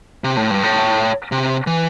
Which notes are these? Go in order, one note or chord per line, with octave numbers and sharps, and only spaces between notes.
C3
A2
G2
A2
C3
E3